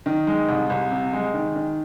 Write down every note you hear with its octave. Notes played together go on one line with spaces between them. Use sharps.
D#3
G#3
C2
C2
C3
G#3
D#3
D#3